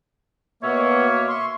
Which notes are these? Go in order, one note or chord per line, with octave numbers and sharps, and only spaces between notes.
B2 A#3 B3 C#5 E5
E5
C6 C#6